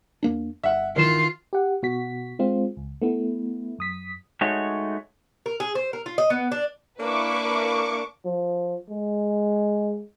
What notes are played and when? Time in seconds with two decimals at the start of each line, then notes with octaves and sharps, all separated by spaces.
0.23 E2 A#3 D4
0.64 G1 E5 F#5
0.96 D#3 E3 F4 E7
1.53 G4 F#5
1.82 B2 F#4 B6
2.39 G#3 C4 F4
2.77 C#2
3.02 A3 B3 E4
3.78 F#2 D#6 B6
4.41 G#3 A3 D#4 F#4 C#5
5.46 A#4
5.60 G#4
5.75 C5
5.93 A#4
6.06 F4
6.18 D#5
6.30 B3
6.52 D4
7.00 A#3 D4 E4 B4 C#6 D6
8.25 F3
8.89 G#3